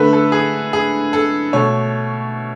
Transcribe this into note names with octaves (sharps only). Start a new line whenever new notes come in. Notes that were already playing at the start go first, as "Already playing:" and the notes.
Already playing: D3 A3 B4
A4
G#4
G#4
A4
B2 A3 C#5